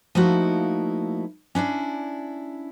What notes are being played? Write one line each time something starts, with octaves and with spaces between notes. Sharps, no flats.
F3 A3 A#3 D#4 E4 F#4
C#4 D4 E4 D5